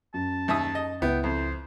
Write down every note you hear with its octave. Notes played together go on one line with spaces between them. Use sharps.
F#2 A5
D#2 E5 D#6
D#5
C#2 B3 E4 G5
F2 C5